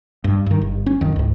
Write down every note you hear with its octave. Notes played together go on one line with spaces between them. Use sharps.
G2
G2 D#3
G1
C#4
D#1 F2 D#3
C#2 G#2